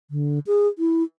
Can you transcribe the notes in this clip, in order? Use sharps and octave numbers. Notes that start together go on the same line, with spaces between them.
D3
G#4
E4